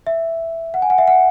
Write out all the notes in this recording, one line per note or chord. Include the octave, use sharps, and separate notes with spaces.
E5
F#5
G#5
F#5
E5
F#5